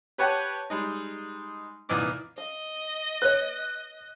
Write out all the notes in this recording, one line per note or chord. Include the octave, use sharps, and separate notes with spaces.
G4 B4 C#5 F#5 G5 A5
G3 G#3 D#4
C2 A#2 E3 D#4 D6
D#5 F5
B4 C#5 F#6